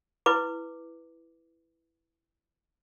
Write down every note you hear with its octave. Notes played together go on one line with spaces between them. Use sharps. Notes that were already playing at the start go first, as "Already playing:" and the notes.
E4 B4 D6